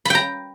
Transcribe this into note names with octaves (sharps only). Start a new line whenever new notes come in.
G5 A#5 B5